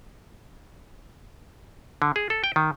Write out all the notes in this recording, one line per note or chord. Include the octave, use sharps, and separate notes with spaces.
D3
G#4
A4
G5
D#3